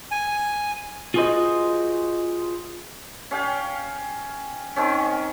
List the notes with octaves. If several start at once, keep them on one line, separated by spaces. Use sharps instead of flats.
G#5
F4 F#4 G#4 B4 C5 D#5
C#4 F5 G5
D#3 C4 C#4